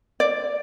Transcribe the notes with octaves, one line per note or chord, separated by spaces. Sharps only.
D5